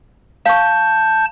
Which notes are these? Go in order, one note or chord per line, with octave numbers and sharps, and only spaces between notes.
F5 A5 C#6 G6